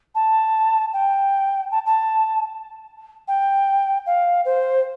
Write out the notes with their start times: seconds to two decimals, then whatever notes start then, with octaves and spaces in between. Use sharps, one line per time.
0.15 A5
0.93 G5
1.71 A5
1.86 A5
3.28 G5
4.06 F5
4.45 C5